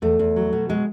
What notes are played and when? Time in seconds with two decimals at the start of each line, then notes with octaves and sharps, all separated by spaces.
0.02 E2 A3
0.19 E2
0.36 F#3
0.53 B2
0.69 F#3 G#3